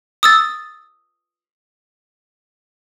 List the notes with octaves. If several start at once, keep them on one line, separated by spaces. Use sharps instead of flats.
D#6 E6 A6